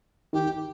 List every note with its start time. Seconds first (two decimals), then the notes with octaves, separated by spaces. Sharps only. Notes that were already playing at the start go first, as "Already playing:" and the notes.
0.33 D#3 G4
0.47 D#3